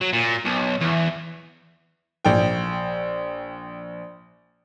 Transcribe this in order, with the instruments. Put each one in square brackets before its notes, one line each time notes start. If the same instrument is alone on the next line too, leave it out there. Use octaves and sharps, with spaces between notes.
[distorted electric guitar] F#3
A#2
B1
E2
[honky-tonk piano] A#1 G5